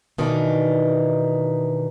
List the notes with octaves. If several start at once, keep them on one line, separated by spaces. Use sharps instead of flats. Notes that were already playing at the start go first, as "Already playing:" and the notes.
B2 D#3 E3 D4 D#4